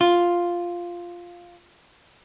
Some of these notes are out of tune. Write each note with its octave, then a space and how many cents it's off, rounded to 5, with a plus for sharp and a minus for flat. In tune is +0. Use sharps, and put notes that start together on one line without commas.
F4 +0